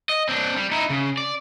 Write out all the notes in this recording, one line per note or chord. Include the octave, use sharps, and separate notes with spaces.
D#5
C4 D4
G3
D#4 E4
C#3
D5